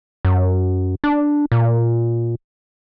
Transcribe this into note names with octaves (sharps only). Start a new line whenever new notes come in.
F#2
D4
A#2